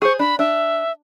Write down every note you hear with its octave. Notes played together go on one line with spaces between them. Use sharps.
G#4 C5 C#6
D4 B5
D4 E5